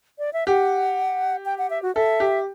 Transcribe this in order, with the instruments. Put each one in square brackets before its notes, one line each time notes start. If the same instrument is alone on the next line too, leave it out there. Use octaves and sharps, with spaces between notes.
[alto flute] D5
E5
[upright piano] G4 [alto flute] F#5
[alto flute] G5
F#5
E5
F#4
[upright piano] A4 [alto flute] E5
[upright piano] G4